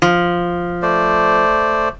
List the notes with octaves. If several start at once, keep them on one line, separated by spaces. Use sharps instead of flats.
F3
A3 C5 D5